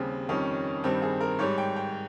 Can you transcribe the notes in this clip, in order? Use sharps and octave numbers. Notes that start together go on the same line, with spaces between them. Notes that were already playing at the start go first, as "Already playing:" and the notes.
Already playing: D#2 C#3 G3 C4
F2 D#3 G3 C#4
G2 D#3 G3 C4
G#4
A#4
G#2 G3 C#5
G5
G5